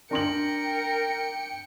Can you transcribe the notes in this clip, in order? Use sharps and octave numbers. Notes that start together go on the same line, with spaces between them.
D4 A#4 G5 C6 C#7 F#7